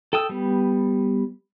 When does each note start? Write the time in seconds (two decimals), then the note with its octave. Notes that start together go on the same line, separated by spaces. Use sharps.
0.13 A4 G5 A5 D#6 E6
0.29 G3 B3